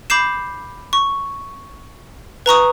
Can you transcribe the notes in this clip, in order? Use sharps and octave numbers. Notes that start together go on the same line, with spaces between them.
B5 D6 G6 C7 E7
C#6
B4 A#5 C#6 D#6